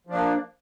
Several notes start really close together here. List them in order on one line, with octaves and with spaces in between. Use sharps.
F3 D4 A#3